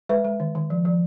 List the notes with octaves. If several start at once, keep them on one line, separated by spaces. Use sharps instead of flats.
G#3 B4
G#3
D#3
D#3
F3
F3